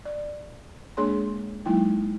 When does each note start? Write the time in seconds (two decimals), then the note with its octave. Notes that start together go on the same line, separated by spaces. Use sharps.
0.05 D5
0.97 G#3 A#3 D4 G#4 C#5 C6
1.65 F#3 G#3 A#3 D#4 E4 G5